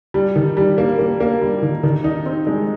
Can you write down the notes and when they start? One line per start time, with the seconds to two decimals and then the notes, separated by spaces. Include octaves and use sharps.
0.14 G3
0.36 D#3
0.57 G3
0.78 A#3
0.99 A#3
1.20 A#3
1.41 G3
1.62 D#3
1.83 D#3
2.04 D#4
2.26 C4
2.47 G#3